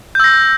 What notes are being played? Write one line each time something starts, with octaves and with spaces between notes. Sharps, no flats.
E6 G6 A#6